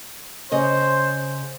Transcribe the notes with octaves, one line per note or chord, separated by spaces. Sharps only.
C#3 C5 D#5